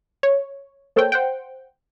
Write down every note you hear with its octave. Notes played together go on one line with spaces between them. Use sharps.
C#5
A#3 A4 C5 C#5 G5
C5 F#5 G5